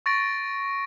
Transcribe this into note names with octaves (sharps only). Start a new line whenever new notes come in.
C#6 A6 A#6 D7